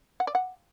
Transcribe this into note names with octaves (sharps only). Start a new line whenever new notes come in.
F#5
D5
F#5